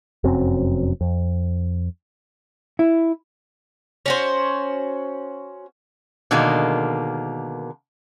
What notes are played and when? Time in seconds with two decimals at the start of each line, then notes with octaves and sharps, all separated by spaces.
0.24 F1 F#2 F#3 C4
1.01 F2
2.79 E4
4.06 C#4 F#4 C5
6.31 B2 D3 D#3 G#3 A#3